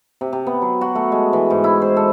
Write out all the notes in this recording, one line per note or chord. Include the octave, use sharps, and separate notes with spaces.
C3
C3
B3
F#3
F#4
A3
G#3
E3
G#2
E4
C5
A4